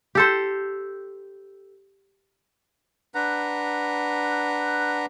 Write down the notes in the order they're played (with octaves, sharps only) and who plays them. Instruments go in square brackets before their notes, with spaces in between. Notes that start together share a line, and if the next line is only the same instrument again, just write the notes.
[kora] G4 A4 C5
[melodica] D4 B4 F#5 A#5